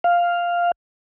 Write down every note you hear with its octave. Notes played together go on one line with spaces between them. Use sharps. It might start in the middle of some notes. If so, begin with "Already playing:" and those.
F5